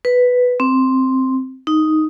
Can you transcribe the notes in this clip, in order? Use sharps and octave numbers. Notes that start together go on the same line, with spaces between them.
B4
C4
D#4